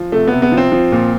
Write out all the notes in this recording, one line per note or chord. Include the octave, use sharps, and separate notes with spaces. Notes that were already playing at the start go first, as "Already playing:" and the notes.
Already playing: F3
C3 A3
C3 B3
B3
F3
C4
F3
A#2